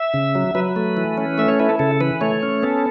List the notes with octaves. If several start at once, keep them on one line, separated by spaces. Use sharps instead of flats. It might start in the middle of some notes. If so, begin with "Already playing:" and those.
Already playing: E5
C#3
F#3
F#3 B4
A3
E3
C#4
A3 E5
C#5
E4 B4
A4
C#3 A4
E3 B4
A3 C#5
C#4
B3 A4